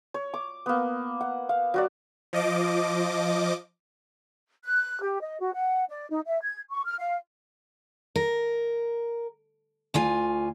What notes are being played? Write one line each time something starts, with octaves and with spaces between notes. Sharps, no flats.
C#5
D6
A#3 B3
F#5
F5
F#3 F#4 D5
F3 D#5 D6
F#6
G4
D#5
F#4
F#5
D5
D#4
E5
G#6
C#6
F6
F5
A#4
D2 F4 G#5